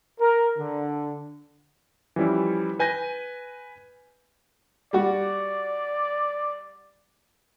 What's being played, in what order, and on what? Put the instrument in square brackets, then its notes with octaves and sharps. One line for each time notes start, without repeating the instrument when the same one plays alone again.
[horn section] A#4
D3
[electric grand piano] E3 F3 G3 C#4 E4
B4 G#5 G6 A#6 D#7
[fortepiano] G3 F#4 [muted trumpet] D5